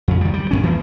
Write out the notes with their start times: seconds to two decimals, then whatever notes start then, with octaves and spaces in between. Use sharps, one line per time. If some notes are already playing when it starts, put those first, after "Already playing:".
0.08 F2 C#3
0.21 D#3 G3
0.33 G3
0.51 F2 G#2 C#4
0.63 E3 F3 A#3